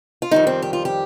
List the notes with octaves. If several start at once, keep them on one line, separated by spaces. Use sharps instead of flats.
F4
F2 D#3 G3 D#4
C4
G4
F4
G4